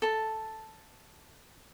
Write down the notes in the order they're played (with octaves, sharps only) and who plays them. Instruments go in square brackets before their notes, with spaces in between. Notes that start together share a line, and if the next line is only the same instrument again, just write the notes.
[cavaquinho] A4 A5